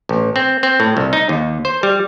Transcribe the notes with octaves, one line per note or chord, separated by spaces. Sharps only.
A1
C4
C4
A2
C2
D#4
D#2
C5
G3